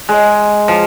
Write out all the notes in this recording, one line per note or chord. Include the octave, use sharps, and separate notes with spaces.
G#3
F3